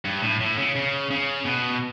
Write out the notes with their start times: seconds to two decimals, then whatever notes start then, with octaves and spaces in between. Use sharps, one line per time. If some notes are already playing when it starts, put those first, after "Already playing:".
0.05 G2
0.23 A2
0.40 A2
0.58 C#3
0.75 C#3
1.11 C#3
1.45 B2